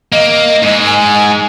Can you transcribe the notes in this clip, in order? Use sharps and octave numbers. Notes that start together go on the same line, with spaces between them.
A#3 D#5
G#2 G#3
G#5